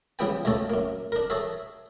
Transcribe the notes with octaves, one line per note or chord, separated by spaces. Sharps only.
C#3 F3 G3 B3 G5 G#5
C#2 A#2 A3 A4 C#5
F#2 A#3
D4 A#4
G#4 A4 C#5 E5